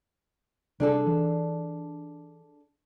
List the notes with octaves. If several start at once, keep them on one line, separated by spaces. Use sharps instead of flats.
C2 D4 G#4 A4
E3